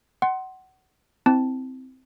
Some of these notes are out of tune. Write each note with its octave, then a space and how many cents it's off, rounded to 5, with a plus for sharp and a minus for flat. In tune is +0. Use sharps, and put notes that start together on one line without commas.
F#5 +25 C6 +10
C4 -10 E4 -15 A5 +0